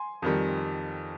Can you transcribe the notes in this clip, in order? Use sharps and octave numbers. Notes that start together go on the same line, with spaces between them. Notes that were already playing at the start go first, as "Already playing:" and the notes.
Already playing: G#5 C6
F2 D#3 G3